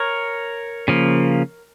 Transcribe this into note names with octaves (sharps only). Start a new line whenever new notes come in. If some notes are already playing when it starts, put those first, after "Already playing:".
Already playing: A#4 C#5
C#3 F3 A#3